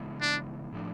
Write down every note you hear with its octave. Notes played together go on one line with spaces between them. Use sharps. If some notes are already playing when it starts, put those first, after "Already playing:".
Already playing: C#3 E3 G#3 B3 D#4
D4
A2 F3 A3 D4